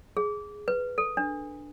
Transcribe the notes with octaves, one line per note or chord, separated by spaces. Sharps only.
G#4
B4
A4
D4